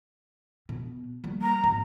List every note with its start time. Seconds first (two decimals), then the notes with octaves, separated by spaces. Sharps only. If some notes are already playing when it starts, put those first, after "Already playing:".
0.69 B2
1.24 G3 A#3
1.42 A#5
1.64 G#1